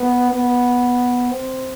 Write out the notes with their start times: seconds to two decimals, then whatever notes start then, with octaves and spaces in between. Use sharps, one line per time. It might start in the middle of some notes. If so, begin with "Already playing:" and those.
Already playing: B3
0.31 B3
1.31 C4